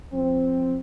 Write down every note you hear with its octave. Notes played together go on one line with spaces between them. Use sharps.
F3 C4